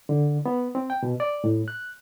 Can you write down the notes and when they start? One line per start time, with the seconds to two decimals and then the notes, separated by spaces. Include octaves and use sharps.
0.09 D3
0.46 B3
0.75 C4
0.90 G5
1.03 B2
1.20 D5
1.44 A2
1.68 F#6